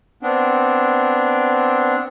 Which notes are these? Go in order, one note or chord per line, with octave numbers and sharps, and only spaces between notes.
B3 C4 D4